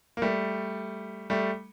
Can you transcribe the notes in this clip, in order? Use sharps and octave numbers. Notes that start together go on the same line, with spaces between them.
A#3
G3 A3
G3 A3